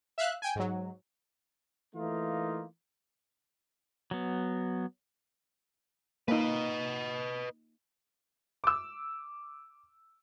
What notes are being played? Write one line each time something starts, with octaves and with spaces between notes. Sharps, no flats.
E5 F5 F#6
G5 G#5
G#2 F#3
E3 A3 A#3 D#4 F4
F#3 B3
A#3 D#4 B4 D#5
D6 E6